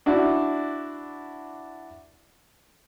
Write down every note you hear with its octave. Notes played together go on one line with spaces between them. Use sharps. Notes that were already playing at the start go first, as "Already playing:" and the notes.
D4 E4 F#4 D5